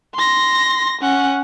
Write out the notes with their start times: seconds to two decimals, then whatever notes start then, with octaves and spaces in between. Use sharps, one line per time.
0.15 C6 A#6
1.02 C#4 F#5